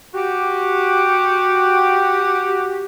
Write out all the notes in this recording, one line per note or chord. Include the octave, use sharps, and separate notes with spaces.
F#4 G4